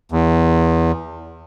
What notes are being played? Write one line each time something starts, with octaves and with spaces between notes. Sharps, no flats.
E2